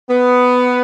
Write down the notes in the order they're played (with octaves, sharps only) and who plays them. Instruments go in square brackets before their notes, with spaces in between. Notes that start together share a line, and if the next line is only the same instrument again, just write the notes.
[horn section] B3